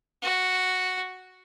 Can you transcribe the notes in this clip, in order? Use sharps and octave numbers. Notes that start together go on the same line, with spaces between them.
F#4